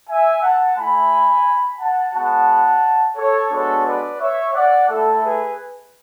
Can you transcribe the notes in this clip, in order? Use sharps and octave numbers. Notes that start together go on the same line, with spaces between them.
E5 G#5
F#5 A5
A3 E4 G#5 B5
F#5 A5
G#3 B3 F#4 F#5 A5
A4 C#5
G#3 B3 D4 F#4 A4 C#5
B4 D5
C#5 E5
D5 F#5
A3 E4 A4
G#4 B4